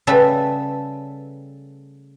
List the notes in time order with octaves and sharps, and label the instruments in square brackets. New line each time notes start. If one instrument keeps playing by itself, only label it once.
[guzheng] C#3 G3 A3 A4 B4 E5